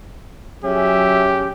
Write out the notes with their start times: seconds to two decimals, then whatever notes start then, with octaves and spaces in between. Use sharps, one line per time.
0.64 F#3 C#4 G4 G#4 E5